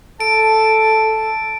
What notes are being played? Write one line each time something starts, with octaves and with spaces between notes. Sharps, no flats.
A4 A5 D7